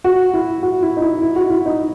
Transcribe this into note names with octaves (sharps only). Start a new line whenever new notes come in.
F#4
E4
F#4
E4
D#4
E4
E4
F#4
E4
D#4